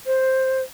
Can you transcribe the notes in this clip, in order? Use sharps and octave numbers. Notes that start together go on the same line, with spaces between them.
C5